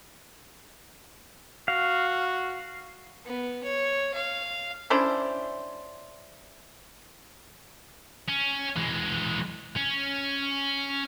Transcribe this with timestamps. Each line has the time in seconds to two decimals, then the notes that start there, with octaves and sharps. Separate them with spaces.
1.68 F#4 F5
3.25 B3
3.63 C#5
4.14 F5
4.90 C#4 D4 E4 C5
8.29 C#4
8.76 E3 G#3
9.76 C#4